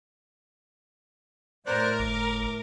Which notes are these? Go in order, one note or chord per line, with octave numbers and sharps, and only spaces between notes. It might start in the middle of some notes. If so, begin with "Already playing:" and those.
A2 A#4 C5 D5 F#6
G1 D6